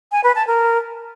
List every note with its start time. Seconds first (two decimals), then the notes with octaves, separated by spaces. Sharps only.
0.12 G#5
0.24 B4
0.35 A5
0.47 A#4